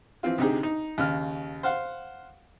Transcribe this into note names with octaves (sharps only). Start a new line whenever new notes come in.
E3 F3 C4 F4
D2 C3 D#4 G4 G#4
D#4
D#2 C#3 F6
C5 F5 F#5